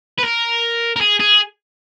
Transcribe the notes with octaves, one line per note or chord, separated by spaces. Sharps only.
B4
A#4
A#4
G#4
G#4